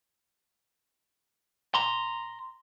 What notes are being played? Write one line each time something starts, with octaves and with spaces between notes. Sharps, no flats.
A#5 C6